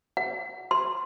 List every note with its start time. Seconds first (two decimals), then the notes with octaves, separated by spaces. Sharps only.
0.17 F#5
0.71 C6